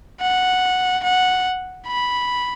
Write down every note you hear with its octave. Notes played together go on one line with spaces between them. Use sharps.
F#5
F#5
B5